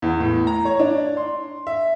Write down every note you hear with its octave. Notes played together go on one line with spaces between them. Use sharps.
E2
A2
A#5
C#5
D4
C6
E5